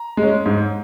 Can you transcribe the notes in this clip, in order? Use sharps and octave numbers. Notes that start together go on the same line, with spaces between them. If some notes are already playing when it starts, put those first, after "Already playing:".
Already playing: A#5
G#3
C#4
G#2